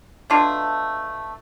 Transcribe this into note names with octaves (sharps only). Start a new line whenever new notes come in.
B2 A3 D4 F4